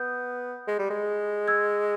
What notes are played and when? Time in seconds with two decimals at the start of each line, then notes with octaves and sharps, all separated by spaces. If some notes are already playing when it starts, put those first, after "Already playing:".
Already playing: B3 D#6 G6
0.68 G#3
0.79 G3
0.90 G#3
1.48 E6 G#6